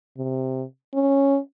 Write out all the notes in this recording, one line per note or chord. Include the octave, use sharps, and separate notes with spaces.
C3
C#4